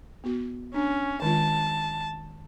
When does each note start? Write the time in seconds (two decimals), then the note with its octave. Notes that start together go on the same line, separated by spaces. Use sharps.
0.24 B3 F#4
0.74 C#4 D4
1.22 D#3 G#3 F4 A5